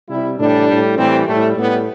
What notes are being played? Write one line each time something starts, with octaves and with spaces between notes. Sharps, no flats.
C3 G3 E4
A2 E3 G3 D4
A2 G3
A2 E3 G3 C4
A2 G3 A3
A2 G3 B3